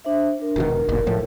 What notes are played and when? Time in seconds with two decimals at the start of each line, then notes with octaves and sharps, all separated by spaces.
0.05 D4 C5 E5
0.40 D4 A#4
0.56 E1 B2 D#3 A#4
0.89 F#1 B1 A#2
1.07 A2 F3